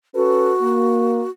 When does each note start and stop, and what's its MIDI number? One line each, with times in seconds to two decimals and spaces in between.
0.15 0.53 61
0.15 1.30 66
0.15 0.53 69
0.15 0.53 71
0.62 1.23 58